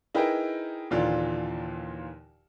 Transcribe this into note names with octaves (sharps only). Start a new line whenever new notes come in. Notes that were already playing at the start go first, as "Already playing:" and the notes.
D#4 E4 G#4 A#4 B4 G5
D#2 A#2 D3 E3 F4 D5